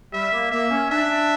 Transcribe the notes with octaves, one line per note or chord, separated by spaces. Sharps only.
G3 E5
A#3
A#3 E5
C#4
D4 E5